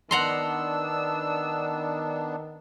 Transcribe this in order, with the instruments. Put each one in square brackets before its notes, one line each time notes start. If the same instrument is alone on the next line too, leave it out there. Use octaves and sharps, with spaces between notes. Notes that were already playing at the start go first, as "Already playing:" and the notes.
[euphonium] D#3 [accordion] B3 D4 [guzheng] F#5 A#5 C6 [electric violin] E6